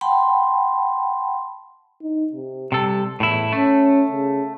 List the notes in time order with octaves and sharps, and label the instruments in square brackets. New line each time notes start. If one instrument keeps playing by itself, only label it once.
[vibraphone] F#5 G5 A5 B5 C6
[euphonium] D#4
C3
[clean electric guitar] C3 A4 [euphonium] G3
[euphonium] E2 [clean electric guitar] A2 E4
[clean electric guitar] A3 [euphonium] C#4
[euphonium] C#3